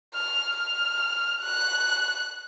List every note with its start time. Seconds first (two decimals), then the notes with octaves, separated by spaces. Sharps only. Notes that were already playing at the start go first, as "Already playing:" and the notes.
0.15 F6
0.58 F6
1.42 F#6